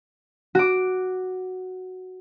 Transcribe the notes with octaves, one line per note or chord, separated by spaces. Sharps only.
F#4 D6